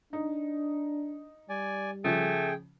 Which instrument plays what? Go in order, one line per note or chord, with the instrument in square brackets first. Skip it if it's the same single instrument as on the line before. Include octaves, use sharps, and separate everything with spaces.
[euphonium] D4 [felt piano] D#4
[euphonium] G3 [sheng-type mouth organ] D5 G#5
[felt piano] C#3 F3 [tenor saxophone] A3 [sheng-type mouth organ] G#4 G5